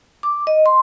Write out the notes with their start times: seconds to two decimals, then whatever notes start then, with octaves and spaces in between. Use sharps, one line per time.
0.23 D6
0.47 D#5
0.66 C6